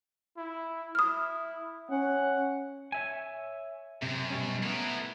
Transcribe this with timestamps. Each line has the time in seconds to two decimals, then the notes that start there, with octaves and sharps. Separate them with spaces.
0.37 E4
0.95 E4 D#6 F6
1.90 C#4 F#5
2.92 C#5 E5 G#5
4.02 F#2 C3
4.30 B2 G3 C#4
4.63 A3 B3 E4 A#4